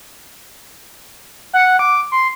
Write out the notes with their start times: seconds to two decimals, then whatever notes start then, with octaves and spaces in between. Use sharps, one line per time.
1.53 F#5
1.79 D6
2.12 C6